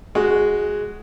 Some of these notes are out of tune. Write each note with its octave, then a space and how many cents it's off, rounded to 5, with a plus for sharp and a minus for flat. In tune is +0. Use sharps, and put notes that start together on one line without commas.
G#3 +0 F#4 +0